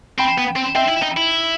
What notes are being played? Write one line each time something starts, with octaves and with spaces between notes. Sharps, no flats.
C4 G5 B5
B3
C4
C4 E5 G5
E4
D#4
E4